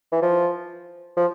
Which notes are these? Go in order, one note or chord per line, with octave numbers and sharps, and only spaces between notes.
E3
F3
F3